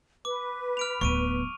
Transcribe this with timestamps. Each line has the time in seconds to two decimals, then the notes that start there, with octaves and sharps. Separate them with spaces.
0.25 B4 D6
0.77 F6 D7 F7
1.01 D1 B3 C#6 D7 D#7